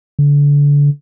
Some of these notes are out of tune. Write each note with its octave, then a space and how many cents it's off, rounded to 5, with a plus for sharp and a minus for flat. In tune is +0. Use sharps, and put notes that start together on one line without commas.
D3 -30